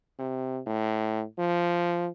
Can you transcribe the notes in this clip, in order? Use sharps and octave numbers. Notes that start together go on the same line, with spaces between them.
C3
A2
F3